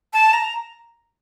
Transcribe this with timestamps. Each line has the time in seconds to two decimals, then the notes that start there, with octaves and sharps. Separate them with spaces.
0.13 A5
0.33 A#5